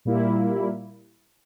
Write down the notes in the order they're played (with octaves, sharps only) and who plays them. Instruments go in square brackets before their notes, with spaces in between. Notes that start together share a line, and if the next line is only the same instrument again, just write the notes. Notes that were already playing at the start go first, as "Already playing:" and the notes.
[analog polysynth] A#2 G3 A#3 E4